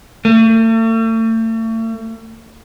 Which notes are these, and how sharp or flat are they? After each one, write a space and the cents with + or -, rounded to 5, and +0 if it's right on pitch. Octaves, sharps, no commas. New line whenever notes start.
A3 +40